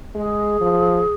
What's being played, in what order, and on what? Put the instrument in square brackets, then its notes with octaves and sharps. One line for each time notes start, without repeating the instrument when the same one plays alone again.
[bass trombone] G#3 [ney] G#4
[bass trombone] F3